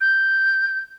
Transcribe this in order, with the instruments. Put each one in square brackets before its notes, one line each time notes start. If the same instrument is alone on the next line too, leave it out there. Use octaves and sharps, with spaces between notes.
[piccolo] G6